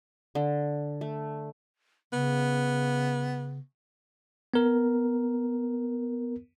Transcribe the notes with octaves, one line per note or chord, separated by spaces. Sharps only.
D3
A3
C#3 B3
B3 A#4